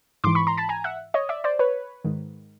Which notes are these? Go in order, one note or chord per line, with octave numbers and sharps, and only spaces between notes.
G#2 E3 C6 D6
B5 C#6
A#5 C6
A5 B5
G#5 A#5
E5 F#5
C#5 D#5
D5 E5
C5 D5
B4 C#5
G#2 D#3